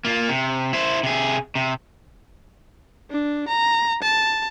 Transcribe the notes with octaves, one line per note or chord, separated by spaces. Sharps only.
A#3 F4
C3
E4 C5
C3 G#4
C3
D4
A#5
A5